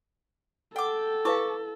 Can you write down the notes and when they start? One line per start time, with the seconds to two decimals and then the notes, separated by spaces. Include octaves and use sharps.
0.76 A4 F#5 G5 D6
1.25 E4 B4 F5 A5 C#6 D6